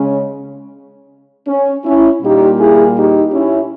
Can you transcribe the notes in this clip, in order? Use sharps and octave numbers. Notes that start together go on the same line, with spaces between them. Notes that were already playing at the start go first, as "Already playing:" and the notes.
Already playing: C#3 G#3 C#4
C#4
C#4 E4
A#2 G3 A#3 D#4 G4
E4 G#4
D#4 G4
C#4 E4